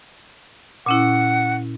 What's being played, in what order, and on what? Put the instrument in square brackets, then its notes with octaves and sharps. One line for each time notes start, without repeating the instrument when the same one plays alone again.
[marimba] A#2 C#4 E4 [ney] F#5